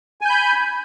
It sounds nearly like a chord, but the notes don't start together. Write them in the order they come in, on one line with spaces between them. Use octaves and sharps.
G#5 G6 B5